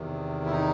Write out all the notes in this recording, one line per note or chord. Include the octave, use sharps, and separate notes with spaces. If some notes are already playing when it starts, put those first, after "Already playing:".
Already playing: E2 C3 D#3
E4
D#4